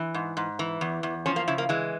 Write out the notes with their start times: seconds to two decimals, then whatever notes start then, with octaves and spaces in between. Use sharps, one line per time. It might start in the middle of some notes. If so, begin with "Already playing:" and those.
Already playing: E3
0.14 G#2
0.37 G#2
0.59 E3
0.81 E2
1.03 E2
1.26 F3 C#4
1.36 A#3
1.48 C#3 E4
1.58 A#3
1.69 E3 G#3